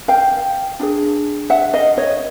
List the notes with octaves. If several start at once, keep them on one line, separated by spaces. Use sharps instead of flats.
F5 G5
D4 F4 G#4
E5 F#5
D#5 F5
C#5 D#5